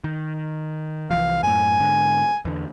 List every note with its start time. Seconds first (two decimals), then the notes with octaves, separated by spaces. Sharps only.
0.04 D#3
1.11 C2 E3 F3 F5
1.43 F#2 A2 G#5
1.80 G#2 D3
2.45 E2 D3